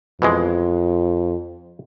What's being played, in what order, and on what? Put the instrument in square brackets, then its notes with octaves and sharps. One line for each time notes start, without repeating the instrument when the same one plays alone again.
[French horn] F2 [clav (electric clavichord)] B2 E3 G#3